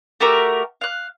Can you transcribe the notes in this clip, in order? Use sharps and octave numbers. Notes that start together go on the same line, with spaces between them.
A3 F#4 G4 A#4
F5 F#6